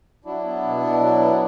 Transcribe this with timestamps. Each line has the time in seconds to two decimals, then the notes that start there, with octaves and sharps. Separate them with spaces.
0.25 F#3 D4 E4
0.44 B3
0.63 B2
0.82 B2
1.00 F#3
1.19 B3